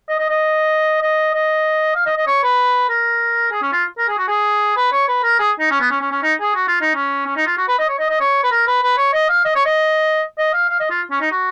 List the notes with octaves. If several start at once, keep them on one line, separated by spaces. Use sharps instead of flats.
D#5
D#5
D#5
D#5
D#5
F5
D#5
D#5
C#5
B4
A#4
G#4
C#4
F4
A#4
G#4
F#4
G#4
B4
C#5
B4
A#4
G#4
D#4
C#4
B3
C#4
C#4
C#4
D#4
G#4
F#4
F4
D#4
C#4
C#4
D#4
F4
F#4
B4
D#5
C#5
D#5
D#5
C#5
B4
A#4
B4
B4
C#5
D#5
F5
D#5
C#5
D#5
D#5
F5
F5
D#5
F4
C#4
D#4
F#4